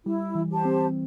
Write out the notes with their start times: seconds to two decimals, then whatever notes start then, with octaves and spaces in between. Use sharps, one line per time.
0.06 G3 E4
0.35 E3
0.50 G4 C5 A5
0.65 C4